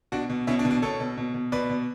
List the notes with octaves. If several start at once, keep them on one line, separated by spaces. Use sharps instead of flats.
B2 D4 F#4
B2
B2 C#4 E4
D4
B2
D4
B2 A4 C#5
B2
B2
B2
B2 B4 D5
B2